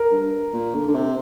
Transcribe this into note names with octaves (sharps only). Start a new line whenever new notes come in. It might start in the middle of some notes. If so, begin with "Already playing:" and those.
Already playing: A#4
G2
A#2
D3
D3
C3